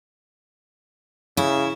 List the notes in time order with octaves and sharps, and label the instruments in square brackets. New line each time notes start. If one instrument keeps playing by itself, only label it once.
[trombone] C#3 [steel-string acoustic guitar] E4